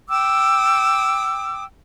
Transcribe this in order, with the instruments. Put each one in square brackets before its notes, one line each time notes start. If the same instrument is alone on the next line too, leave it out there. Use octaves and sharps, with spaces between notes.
[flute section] G5 D6 E6